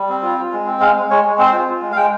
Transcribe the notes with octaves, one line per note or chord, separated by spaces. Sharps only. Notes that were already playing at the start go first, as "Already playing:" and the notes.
Already playing: G3
C4
F4
F4
G#3
C4
G#3 F5
G#3
G#3 C#5
G#3
C4 C5
F4
F4
G#3
F5
G#3 G5